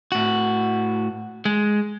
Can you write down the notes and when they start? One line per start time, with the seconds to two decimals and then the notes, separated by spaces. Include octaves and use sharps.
0.12 A2 F#4
1.45 G#3